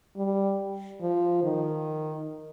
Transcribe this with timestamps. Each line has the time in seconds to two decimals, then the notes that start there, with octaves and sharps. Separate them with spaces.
0.17 G3
1.01 F3
1.43 D#3